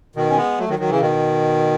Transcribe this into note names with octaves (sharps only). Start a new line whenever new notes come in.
B2 D#3
C#4
G#3 B3
F#3 A3
D#3 F#3
D#3 F#3
C#3 E3
B2 D#3